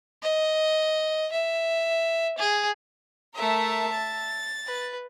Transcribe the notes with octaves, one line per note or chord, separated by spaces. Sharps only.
D#5
E5
G#4
A3 A#4 E5 A5
A6
B4